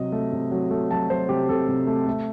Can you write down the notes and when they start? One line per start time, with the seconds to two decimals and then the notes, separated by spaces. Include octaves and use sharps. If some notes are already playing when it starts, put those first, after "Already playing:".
Already playing: C3 F#3 D#5
0.12 A3
0.32 C3
0.51 F#3
0.71 A3
0.91 F#3 A5
1.09 F#3 C5
1.29 C3 G4
1.49 C3 A4
1.68 C3
1.87 A3
2.07 A3